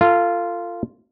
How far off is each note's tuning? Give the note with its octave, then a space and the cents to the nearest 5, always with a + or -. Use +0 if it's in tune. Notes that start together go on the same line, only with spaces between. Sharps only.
F4 -10 A4 +30